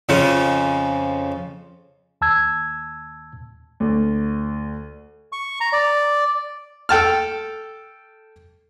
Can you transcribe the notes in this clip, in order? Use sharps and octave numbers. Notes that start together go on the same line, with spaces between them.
F2 C#3 F3 C#4
D#2 A5 E6 G#6
D2
C#6
A#5
D5
A4 G5 A5 F6